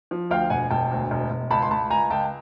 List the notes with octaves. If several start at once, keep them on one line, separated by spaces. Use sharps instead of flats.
F3
D2 F5 G5
E1 F#5 G#5
E1 G5 A5
D2
E1
E1
C#2 A5 B5
C6
C#2 A5 B5
C#2 G#5 A#5
C#2 G5 A5